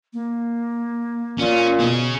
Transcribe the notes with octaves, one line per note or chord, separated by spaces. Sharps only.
A#3
A#2 C#4
B2 C#4 G#4